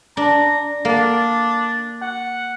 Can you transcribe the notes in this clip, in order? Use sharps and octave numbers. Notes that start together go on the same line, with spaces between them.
D4 A#5
A#3 D4
F#5